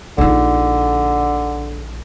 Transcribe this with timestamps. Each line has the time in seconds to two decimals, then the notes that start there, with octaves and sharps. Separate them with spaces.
0.18 A#1 D3 D#4